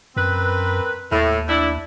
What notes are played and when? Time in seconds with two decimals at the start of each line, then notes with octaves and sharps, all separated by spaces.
0.17 F#2 C4 A#4 B4
1.12 D#2 A2
1.48 A2 D4 E4